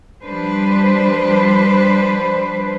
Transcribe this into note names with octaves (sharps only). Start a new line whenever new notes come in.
F3 G3 D4 B4 C5